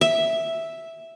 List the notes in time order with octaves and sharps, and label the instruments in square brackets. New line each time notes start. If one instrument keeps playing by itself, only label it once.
[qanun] E5